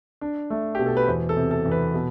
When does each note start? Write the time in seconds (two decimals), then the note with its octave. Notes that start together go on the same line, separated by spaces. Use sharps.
0.21 D4
0.50 A3
0.75 B2 G4
0.86 A4
0.97 B4
1.07 E2 C5
1.29 A4
1.37 C3
1.51 A4
1.66 E2
1.72 B4
1.94 B2